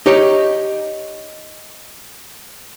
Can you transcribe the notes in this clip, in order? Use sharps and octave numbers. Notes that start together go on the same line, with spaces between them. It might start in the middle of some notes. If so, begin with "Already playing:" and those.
D#4 G4 C#5